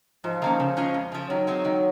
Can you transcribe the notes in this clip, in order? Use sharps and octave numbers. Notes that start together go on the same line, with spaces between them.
G#2 F3
D#3 A#3 C#4
C#3
G#3 C#4 F4
F2
C#3 F3
D#3 F#3
G#3 C4 D#4
D#3